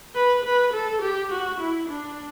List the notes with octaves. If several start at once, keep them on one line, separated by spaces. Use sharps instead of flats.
B4
B4
A4
G4
F#4
E4
D4